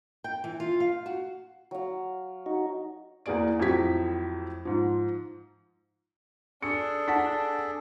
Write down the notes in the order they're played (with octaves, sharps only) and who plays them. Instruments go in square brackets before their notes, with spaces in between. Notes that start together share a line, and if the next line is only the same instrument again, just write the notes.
[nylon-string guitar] G5
E3
F4
F5
F#4
[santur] F#3 F5
[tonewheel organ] D#4 F#4
[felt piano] E2 A#3 G#4 D5 D7
F2 A2 F#3 G4 G#6 B6
G#2 F3
[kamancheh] D4 [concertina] G#4 A4 [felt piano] C#7
[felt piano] F#5 A5 B6